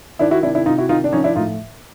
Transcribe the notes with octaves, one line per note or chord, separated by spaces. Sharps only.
D#3 D4 E4
E4 F#4
C3 D4 E4
D4 E4
C3 D#4 F4
E4 F#4
D#3 D#4 F4
D4
F3 C#4 D#4
D4 E4
A2 D#4 F4